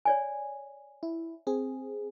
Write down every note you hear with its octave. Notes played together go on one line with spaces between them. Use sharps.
C#5 D5 G#5
E4
C4 G#4